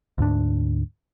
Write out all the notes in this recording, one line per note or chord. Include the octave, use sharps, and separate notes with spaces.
D2 G#2 D4